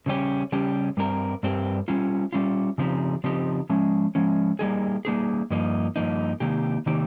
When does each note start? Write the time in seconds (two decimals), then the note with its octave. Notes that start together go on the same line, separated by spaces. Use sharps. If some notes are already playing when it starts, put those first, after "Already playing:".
0.06 C#3 G3 C#4 G4
0.52 C#3 G3 C#4 G4
0.97 G2 G3 C4 G4 A#4
1.43 G2 G3 C4 G4 A#4
1.88 G3 C#4 F4
2.33 G3 C#4 F4
2.78 C#3 F3 C4 D#4 G4
3.24 C#3 F3 C4 D#4 G4
3.69 F3 G#3 C#4
4.15 F3 G#3 C#4
4.59 G3 A#3 D#4 G#4
5.05 G3 A#3 D#4 G#4
5.51 G2 F3 A#3 D#4
5.96 G2 F3 A#3 D#4
6.40 C3 D#3 A#3 D#4 G4
6.86 C3 D#3 A#3 D#4 G4